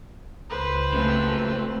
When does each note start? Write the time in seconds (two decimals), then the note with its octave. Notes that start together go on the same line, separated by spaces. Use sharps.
0.50 C#2 B4 C5
0.93 C#3 F#3 A3 C4